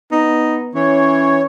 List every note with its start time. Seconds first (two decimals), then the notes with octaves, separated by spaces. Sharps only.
0.12 B3 D#4
0.75 E3 C#4 C#5